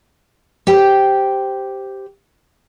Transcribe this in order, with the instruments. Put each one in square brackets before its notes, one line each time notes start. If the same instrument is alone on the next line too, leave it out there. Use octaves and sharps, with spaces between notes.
[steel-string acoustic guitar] G4 C5 G5